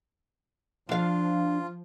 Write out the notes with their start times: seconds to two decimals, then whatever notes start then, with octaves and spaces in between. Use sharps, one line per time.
0.89 F3 D4 F4 F5